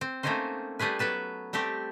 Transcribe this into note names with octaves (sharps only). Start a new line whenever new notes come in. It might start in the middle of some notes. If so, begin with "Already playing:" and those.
C4
A3 A#3 C4 C#4 D#4 C5
G3 A3 G#4 B4
F#3 B3 B4 A5
G3 A3 C4 G4